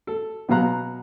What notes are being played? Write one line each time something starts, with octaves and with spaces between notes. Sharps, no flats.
A4
B2 F#3 B3 F5 A#5 F#6